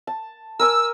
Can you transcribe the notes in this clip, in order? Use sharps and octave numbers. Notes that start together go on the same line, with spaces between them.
A5
A#4 G#5 C#6 E6